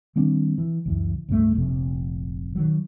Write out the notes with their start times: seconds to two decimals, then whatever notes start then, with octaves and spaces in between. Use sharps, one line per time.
0.16 D#3 G3 C4 D4
0.58 E3
0.86 C#2 F#2 E3
1.28 C#2 G2 G3 A3
1.54 F1 A#1 C3
2.55 D#3 F#3